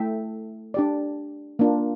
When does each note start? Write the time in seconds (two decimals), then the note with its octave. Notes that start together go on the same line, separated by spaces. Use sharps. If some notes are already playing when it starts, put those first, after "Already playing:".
Already playing: A3 E4 A4 E5 G5
0.74 D4 G4 D5
1.59 A#3 D4 F4